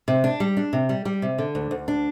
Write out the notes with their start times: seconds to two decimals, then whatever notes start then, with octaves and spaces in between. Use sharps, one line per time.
0.08 C3
0.24 D4
0.40 G3
0.57 D4
0.73 C3
0.89 G3
1.05 G3
1.22 C3
1.38 D3
1.55 D2
1.71 D2
1.88 D4